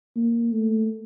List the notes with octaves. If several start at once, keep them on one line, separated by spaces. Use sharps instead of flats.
A#3
A3